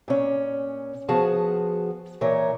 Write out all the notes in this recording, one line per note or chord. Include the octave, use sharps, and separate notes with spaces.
A#2 C#4
F3 B3 F#4 G#4 A5
A#2 E3 A#4 C#5